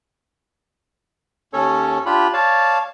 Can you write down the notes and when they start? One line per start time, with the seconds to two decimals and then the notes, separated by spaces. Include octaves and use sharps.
1.53 D#2 C#4 A4 C#5
2.06 D4 F4 G4 B5
2.33 C#5 D5 F5 A5